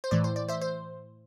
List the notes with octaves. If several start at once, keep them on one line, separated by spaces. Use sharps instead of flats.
C5
A2 E3 D5
C5
D5
C5 E5
C5